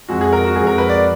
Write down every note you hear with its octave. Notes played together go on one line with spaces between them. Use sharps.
F2 F3 G#3 F#4
G#4
A#4
F#4
F2 F3 G#3 G#4
A#4
B4
D5